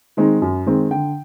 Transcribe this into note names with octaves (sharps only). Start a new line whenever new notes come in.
D#3 G#3 C4 D#4
F#2
D#3 G#3 C4 D#4
D3 G5